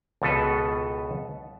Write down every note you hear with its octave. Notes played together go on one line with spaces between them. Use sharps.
C#2 B2 A4 B4